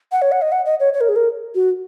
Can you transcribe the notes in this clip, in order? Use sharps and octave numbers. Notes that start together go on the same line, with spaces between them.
F#5
C#5
F#5
D#5
F#5
D#5
C#5
C#5
A#4
G#4
A#4
F#4